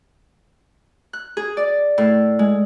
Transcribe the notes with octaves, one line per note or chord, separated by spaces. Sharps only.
F#6
G#4
D5
A2
G#3